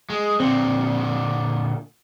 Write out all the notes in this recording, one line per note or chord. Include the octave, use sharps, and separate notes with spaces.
G#3
A#2 D3 C4